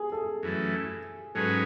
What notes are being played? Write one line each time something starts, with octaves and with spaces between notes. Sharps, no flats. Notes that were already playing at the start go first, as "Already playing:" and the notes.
Already playing: G#4
A4
F#2 E3 A3
G#2 F#3 C#4 G#4 A4 B4